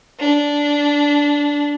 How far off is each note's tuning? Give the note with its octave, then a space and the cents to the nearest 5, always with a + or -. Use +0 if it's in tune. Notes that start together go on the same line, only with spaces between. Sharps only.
D4 -10